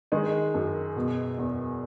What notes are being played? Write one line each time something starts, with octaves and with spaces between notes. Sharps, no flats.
D#3 G#3
F#2
B2
E2